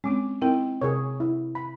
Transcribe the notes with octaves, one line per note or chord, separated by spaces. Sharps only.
G#3 C4 C#4 D6
C4 D#4 E4 A#4 G5
C3 G#4 A#4 C#5
E4
B5